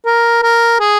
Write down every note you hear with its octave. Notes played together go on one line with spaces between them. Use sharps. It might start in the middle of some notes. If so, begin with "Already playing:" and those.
A#4
A#4
G#4